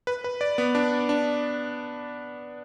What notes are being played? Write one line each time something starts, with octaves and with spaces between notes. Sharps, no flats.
B4
B4
D5
B3
D4
D4